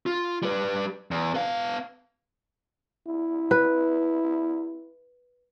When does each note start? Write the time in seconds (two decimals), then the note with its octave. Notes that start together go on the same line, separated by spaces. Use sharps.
0.06 F4
0.43 G3 B4
1.11 E2
1.34 B3 F5
3.07 E4
3.51 B4